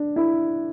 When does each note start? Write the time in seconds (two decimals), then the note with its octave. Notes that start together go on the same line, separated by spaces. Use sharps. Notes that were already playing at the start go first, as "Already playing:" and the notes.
Already playing: D4
0.16 E4